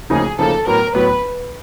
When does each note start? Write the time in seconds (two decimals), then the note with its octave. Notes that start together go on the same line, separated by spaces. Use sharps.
0.10 D2 C#3 F3 A#3 D#4 G#4
0.38 D2 C#3 F3 A#3 D#4 A4
0.67 A2 F#3 B3 A#4
0.94 A2 F#3 B3 B4